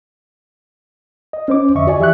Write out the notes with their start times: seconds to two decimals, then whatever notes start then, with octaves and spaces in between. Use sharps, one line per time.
1.33 D#5
1.48 C#4 C5 D6
1.75 F2 D3 D#5 E5 C#6
1.87 F#4 D5 G#5
1.99 E3 G4 E5 C#6 F#6